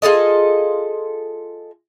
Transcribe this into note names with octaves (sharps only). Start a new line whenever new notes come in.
F4 G#4 A4 D#5